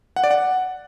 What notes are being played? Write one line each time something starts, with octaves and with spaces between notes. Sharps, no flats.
F#5
D5
F#5